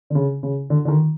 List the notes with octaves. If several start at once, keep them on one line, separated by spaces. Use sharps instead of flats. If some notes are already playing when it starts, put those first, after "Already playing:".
D3
C#3
C#3
D3
D3
D#3